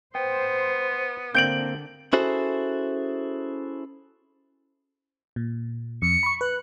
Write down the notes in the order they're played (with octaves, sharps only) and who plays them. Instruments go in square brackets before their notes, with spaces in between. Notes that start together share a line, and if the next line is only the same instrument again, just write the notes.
[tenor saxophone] B3 [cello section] C5 [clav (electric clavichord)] G5
[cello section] D3 [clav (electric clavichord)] A#3 C4 [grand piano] G6 D7 F#7
[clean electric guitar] C#4 E4 F#4 G#4 A4 C5
[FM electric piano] A#2
[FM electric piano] F2 [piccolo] C#7
[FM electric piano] B5 C#6
[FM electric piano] B4 [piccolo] F#6